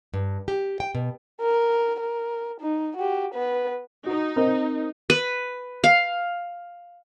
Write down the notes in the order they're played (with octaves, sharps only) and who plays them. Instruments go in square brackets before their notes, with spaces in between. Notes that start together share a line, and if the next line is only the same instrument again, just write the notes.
[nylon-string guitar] G2
G4
G5
B2
[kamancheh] A#4
A#4
D#4
F#4 G4
B3 B4
[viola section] D#4 [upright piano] F#4
[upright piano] C4 A#4 D#5
[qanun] B4
F5